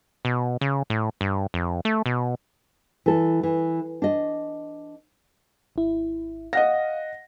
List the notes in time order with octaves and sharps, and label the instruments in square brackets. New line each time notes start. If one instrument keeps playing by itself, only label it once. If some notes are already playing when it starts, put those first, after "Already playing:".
[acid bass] B2
C#3
A2
G2
F2
A3
B2
[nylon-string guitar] E3 A4
E3
D4 D#5
[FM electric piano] G#1 E4
[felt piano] D#5 F#5 A#6 [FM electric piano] F5